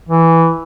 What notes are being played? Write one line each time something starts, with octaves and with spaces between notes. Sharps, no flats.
E3